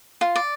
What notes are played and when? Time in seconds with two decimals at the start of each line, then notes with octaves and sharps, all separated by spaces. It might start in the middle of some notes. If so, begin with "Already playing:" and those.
0.21 F4
0.36 D5